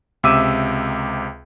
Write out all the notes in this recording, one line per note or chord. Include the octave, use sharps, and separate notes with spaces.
C#2 C3 E5 D6 E6 D#7